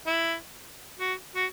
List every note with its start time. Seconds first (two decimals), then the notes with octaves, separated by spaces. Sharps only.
0.07 E4
0.99 F#4
1.35 F#4